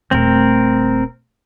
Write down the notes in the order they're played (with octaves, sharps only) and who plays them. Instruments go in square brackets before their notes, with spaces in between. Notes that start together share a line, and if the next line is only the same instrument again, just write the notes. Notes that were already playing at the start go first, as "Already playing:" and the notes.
[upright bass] D#1 A3 [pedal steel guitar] C4 A#4